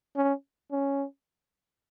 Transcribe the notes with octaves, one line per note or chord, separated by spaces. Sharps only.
C#4
C#4